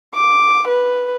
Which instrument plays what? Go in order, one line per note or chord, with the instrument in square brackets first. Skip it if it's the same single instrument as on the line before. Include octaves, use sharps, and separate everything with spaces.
[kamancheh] D6
B4